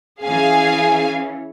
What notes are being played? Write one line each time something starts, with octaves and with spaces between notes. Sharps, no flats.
E3 C#4 G#4 F5 G#5